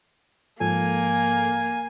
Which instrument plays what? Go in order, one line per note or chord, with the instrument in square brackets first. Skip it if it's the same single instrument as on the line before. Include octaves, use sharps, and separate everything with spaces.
[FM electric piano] G#2 F3 A4 [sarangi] A#3 [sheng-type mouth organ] G#5